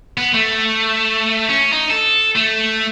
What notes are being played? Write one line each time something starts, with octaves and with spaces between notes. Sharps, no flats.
B3
A3
C#4
D#4
A4
A3